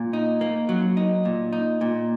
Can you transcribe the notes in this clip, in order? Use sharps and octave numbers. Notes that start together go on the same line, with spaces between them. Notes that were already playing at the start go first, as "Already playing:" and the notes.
Already playing: A#2
D#4
A#3
F#3
D#4
A#2
D#4
A#2